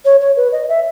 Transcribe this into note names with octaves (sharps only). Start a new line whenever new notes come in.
C#5
C#5
B4
D#5
E5